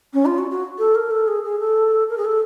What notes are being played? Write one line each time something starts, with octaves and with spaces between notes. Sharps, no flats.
C#4
F4
F#4
F#4
A4
A#4
A4
G#4
G#4
A4
A#4
G#4
A4